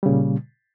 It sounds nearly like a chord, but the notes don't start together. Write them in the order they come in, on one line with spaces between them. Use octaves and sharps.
G3 C#3 A#2